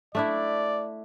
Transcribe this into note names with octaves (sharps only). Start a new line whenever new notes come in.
A3 D4 E4 D5